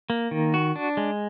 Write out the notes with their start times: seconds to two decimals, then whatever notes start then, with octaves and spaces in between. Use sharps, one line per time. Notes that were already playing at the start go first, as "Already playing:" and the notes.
0.10 A#3
0.31 D#3
0.54 F#4
0.76 D4
0.97 G#3